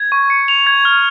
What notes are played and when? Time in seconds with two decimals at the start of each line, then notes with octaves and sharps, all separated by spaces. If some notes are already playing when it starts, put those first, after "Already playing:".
Already playing: G#6
0.12 C#6
0.30 C#7
0.48 F7
0.67 G#6
0.85 F6